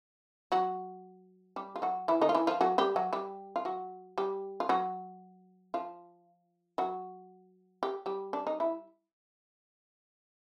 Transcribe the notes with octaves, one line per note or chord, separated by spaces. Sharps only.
F#3 F#4
G3 G4
F4
F#3 F#4
E3 E4
D#3 D#4
F4
E3 E4
F3 F4
F#3 F#4
G3 G4
F#3 F#4
G3 G4
F4
F#3 F#4
G3 G4
F4
F#3 F#4
F3 F4
F#3 F#4
G4
G3 G4
D4
D#4
E4